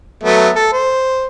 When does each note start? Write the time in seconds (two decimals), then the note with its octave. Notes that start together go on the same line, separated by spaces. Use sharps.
0.24 F#3 A3 B3
0.55 A4
0.72 C5